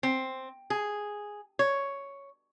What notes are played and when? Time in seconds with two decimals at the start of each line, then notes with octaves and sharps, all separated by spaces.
0.03 C4
0.70 G#4
1.59 C#5